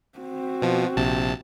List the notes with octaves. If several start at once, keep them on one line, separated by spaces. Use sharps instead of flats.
C4 F#4
B2 F3
A#1 C3 A5